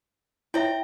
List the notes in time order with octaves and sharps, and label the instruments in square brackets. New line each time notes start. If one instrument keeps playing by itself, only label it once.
[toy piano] E4 C#5 E5 [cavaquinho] G5 A#5